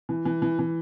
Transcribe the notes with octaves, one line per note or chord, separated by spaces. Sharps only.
E3
E3
E3
E3